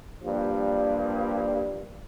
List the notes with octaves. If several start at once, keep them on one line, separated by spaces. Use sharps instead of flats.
G2 F3 G3 A#3